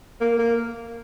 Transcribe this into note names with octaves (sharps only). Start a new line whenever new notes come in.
A#3
A#3